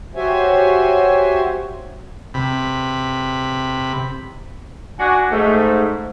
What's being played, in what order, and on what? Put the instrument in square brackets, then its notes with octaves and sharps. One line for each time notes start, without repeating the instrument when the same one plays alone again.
[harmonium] F#4 G4 C5 C#5 E5 G#5
[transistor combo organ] C3 B5
[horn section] D4 F#4 [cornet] G#5
[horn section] G#2 [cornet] A3